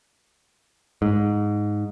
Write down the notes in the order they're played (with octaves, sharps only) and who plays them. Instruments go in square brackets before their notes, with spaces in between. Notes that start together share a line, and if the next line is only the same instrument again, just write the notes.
[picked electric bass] G#2